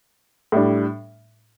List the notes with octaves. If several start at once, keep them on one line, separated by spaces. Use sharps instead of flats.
A2 G3 D4